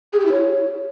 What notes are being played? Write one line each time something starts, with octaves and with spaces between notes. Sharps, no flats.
G#4
G4
E4
C#5